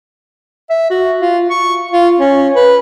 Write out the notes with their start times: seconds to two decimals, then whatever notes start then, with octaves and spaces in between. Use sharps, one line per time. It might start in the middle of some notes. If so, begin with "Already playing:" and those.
0.70 E5
0.90 F#4
1.22 F4
1.50 C#6
1.91 F4
2.18 C#4
2.56 B4